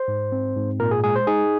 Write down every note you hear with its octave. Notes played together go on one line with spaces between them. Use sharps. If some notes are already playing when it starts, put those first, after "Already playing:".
Already playing: C5
G#2
C4
G#2
A#2 A#4
G#4
G#3 G#4
C5
D#4 G#4